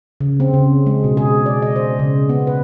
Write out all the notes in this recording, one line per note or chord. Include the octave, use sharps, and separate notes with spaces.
C#3
C4
C#3
G#3
B2
G#4
D5
D#5
C5
C#3
B3
B4